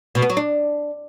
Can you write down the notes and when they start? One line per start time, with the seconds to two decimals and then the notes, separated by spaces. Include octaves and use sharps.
0.15 B2
0.22 B3
0.30 F#3
0.37 D4